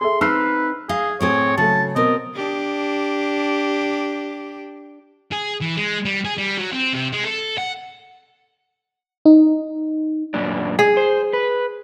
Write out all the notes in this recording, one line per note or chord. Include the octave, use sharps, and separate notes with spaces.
G#4 A4 E5 C6
C4 D#4 B4 E6 F6 C7
G#4 D#5 F5
A2 C4 G#4 C#5
C#3 F#3 A3 A5
B2 C4 A#4 D#5
D4 G4
G#4
E3
G#3
G3
G#4
G3
F#3
C4
C3
G#3
A4
F#5
D#4
F#2 A#2 D4
G#4
C5
B4